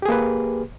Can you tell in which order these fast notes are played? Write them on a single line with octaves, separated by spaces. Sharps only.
G4 G#4 A#3 B4